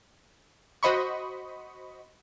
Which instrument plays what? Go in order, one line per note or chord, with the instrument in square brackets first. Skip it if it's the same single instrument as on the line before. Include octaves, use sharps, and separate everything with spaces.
[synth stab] F#4 C5 D#5 B5 C#6